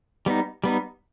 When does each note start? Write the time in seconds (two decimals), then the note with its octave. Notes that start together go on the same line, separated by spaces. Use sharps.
0.26 G3 B3 D#4
0.64 G3 B3 D#4